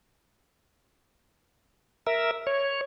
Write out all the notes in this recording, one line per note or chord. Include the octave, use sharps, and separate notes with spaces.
A#4 E5
C#5